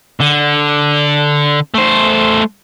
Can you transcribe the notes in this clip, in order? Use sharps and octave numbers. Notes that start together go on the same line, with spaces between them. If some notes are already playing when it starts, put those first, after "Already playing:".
D3
A3 C5